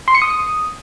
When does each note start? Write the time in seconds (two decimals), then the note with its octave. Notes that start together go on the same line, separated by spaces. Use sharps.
0.08 C6
0.15 C#7
0.22 D#6